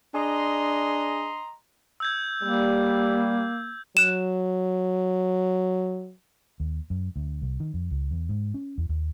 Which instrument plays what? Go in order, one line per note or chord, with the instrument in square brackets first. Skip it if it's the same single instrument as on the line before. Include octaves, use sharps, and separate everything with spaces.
[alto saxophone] D4 [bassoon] G#4 [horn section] D#5 A#5 C6
[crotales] E6 G6 G#6
[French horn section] G3 [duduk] A#3
[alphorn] F#3 [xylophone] F#6 E7
[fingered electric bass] D#2
F#2
D2
C2
D#3
F2
C#2
E2
G#2
C#4
E2
D#2